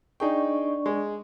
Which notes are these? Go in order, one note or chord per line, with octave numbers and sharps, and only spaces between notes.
D4 D#4 G#4 D5 G5 C#6
G#3